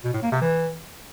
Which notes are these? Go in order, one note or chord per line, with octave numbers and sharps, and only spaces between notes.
B2
A2
A#3
C3
E3